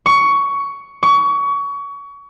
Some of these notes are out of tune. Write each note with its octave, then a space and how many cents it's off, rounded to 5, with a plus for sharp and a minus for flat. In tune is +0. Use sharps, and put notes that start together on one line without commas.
C#6 +15
C#6 +30